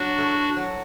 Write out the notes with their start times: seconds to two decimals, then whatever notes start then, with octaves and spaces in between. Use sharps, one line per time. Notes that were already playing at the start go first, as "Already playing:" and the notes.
Already playing: F#3 D4 F#4
0.18 A3 E4 A4
0.56 F#3